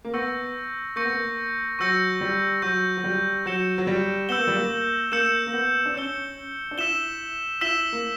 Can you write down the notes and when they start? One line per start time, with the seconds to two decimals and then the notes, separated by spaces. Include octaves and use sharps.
0.05 A#3
0.14 B3 C#6 E6 G6 A#6 C#7
0.96 A#3 C#6 E6 G6 A#6 C#7
1.05 B3
1.13 A#3
1.79 F#3 C#6 E6 G6 A#6 C#7
2.21 G3
2.62 F#3 C#6 E6 G6 A#6 C#7
2.97 F#3
3.04 G3
3.46 F#3 E6 G6 C#7 E7 G7
3.78 F#3
3.87 G3
4.29 B3 E6 G6 C#7 E7 G7
4.38 A#3
4.47 G3
4.56 A#3
5.12 A#3 E6 G6 C#7 E7 G7
5.47 A#3
5.53 B3
5.86 D4
5.95 C#4 E6 G6 C#7 E7 G7
6.71 D4
6.78 E4 E6 B6 E7 G7
7.61 E4 E6 B6 E7 G7
7.92 A#3